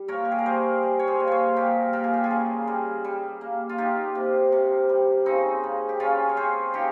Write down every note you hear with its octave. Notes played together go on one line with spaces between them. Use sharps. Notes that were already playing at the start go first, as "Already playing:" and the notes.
Already playing: G3
A#2 A#4 C#5
G4
G#4
A#4
G3 G#4 C5
G3
C#5
G#4 C5
A#2
G#4 C5 C#5
A#2 G4 A#4
A#2 A#4
G#4
G4
F4 G#4
C#3
G3
G3
A#3
F4
A#3 D#4 G4
C3
C3
G3
C#3 C4 D#4
C#3
G4
C#3 C#4 F4
C#5
C4 G#4 C5
C#3 D#4 G4